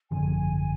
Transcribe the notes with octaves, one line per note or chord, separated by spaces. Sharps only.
G#1 F#2 D3 F3 G#5